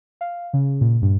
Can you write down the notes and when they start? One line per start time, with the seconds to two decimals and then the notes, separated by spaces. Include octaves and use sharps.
0.21 F5
0.53 C#3
0.81 A#2
1.02 G2